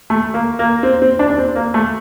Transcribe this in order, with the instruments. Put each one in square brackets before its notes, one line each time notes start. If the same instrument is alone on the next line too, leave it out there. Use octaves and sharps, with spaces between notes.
[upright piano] A3
A#3
A#3
C4
C4
D4
D4
C4
A#3
A3